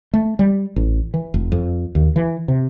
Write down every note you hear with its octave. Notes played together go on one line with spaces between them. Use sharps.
A3
G3
A1
E3
F1
F2
D#2
E3
C3